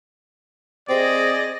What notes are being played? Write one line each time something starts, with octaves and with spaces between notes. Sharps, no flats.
C4 G#4 D5 D#5 A#6